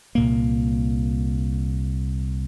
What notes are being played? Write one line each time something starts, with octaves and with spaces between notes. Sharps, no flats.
C2 A#2 A#3